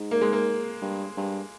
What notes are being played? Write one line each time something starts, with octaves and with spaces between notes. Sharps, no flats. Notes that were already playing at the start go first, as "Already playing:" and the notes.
Already playing: G#2
A#3
G#3
A#3
G2
G2